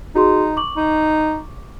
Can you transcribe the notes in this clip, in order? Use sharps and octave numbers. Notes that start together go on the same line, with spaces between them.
D#4 F#4 G#4 C6
C#6 D6 F#7
D#4